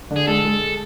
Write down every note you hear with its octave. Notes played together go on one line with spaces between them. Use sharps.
D3
G#4
G#3 A4
G#3